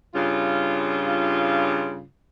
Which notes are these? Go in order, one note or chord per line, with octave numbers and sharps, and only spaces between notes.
G2 C#3 F4